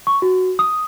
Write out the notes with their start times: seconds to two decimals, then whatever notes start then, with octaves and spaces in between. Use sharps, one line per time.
0.07 C#6
0.22 F#4
0.59 D#6